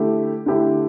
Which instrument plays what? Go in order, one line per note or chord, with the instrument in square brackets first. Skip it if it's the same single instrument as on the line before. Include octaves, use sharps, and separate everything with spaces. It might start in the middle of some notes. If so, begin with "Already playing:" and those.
Already playing: [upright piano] D3 A3 E4 G4
D3 A3 E4 G4